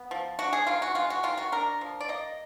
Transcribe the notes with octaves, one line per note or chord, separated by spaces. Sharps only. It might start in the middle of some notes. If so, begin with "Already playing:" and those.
Already playing: B3
F3
D4 F#4
G#4
D#3 F4
F#4
G#3 F4
F#4
D#3 F4
F#4
D4 A#4
F3
D5
A#3 D#5